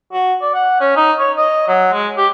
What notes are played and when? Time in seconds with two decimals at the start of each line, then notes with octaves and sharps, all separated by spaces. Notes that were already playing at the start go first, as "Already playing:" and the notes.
0.13 F#4
0.41 D5
0.54 F#5
0.80 C#4
0.97 D#4
1.19 C#5
1.38 D#5
1.68 F#3
1.93 G#3
2.17 G4